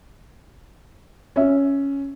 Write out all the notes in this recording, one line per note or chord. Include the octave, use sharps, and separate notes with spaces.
C#4 E5